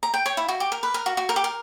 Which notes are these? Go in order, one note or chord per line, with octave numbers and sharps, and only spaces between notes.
A#5
G5
C#5
E4
F#4
G4
A#4
B4
A#4
F#4
F#4
A#4
G4
A#4